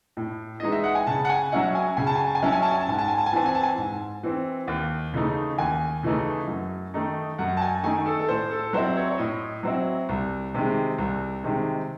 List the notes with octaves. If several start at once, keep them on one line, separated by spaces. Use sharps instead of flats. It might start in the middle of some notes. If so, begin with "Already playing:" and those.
A2
E3 G#3 D#4 D#5
E5
F#5
G#5
C#3 A5
F#5
G#5
F#3 C#4 E4 F#5
G#5
C#3 G#5
A5
G#5
A5
G#5
F#3 C#4 E4 A5
G#5
A5
G#5
A5
G#2 G#5
A5
G#5
A5
G#5
E3 C4 A5
G#5
A5
G#5
G#2
E3 C4
D#2
C#3 E3 A3 D#4
D#2 G#5
C#3 E3 A3 D#4
F#2
D#3 A3 D#4
F#2 F#5
A5
G#5
D#3 A3 D#4 G#5
A4
A4
A2 C5
A4
F#3 C4 E4 C5
C#5
C#5
A2 D#5
F#3 C4 E4
C2
C3 D#3 G#3
C2
C3 D#3 G#3